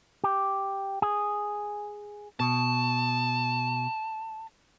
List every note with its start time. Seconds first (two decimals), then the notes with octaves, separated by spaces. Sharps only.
0.24 G4
1.02 G#4
2.40 B2 A5